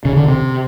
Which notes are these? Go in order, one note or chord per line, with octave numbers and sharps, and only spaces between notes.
C#3
D3
C3